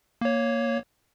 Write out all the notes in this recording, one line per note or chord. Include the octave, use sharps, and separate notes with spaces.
A#3 C#5